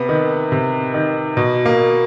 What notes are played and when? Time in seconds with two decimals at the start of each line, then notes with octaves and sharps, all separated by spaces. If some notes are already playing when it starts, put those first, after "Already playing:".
Already playing: C3 B3
0.09 D#3
0.52 C3
0.94 D#3
1.37 B2
1.66 A#3